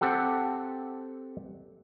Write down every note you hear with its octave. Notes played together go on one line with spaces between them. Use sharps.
C4 G4 A4 F#5